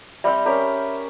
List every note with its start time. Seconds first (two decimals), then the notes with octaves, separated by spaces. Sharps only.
0.24 G3 C4 E5 G5 B5
0.45 C#4 G4 A#4